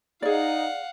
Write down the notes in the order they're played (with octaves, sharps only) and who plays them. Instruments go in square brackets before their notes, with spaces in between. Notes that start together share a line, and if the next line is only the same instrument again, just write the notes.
[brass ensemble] D#4 [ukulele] G#4 D5 [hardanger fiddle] F5 F#5